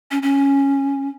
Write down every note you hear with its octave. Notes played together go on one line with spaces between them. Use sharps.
C#4
C#4